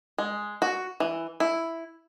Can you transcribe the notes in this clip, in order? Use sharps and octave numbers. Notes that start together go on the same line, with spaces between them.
G#3
F#4
E3
E4